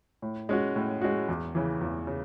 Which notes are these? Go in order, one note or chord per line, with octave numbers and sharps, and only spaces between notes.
A2
G#3 C#4 F#4
A2
G#3 C#4 F#4
E2
C#3 E3
E2
C#3